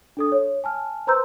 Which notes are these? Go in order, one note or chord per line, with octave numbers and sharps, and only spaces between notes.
D4 A4 D#6
C#5
G#5 A5 F6
B4 C5 A#5 C6 E6 G6